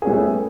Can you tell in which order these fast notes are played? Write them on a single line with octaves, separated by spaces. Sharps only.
G#4 C#4 G3 B3 A3